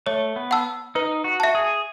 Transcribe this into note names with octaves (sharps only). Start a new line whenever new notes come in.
A3 C#5
B3
F#5 A5 E6
D#4 B4
F#4
E5 A5
G#4